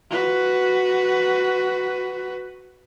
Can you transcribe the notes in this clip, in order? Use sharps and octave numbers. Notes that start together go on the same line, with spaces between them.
F#4 B4